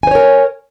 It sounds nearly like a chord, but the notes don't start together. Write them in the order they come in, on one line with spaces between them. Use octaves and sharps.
G#5 C5 C#5 A#4